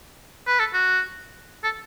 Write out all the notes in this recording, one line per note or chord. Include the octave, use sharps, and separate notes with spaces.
B4
A4
F#4
A4